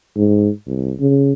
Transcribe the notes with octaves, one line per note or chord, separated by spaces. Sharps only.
G#2
C2
C#3